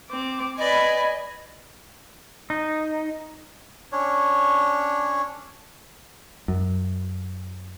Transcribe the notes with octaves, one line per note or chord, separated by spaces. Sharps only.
C4 D6
B4 D5 D#5 G#5 B5
D#4
C#4 D4 C#5
F#2